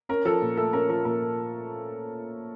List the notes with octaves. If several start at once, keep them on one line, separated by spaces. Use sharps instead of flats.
C#4 A#4
F3 A4
A#2
A3 A4
C#4 A#4
F3 A#4
A#2 A#4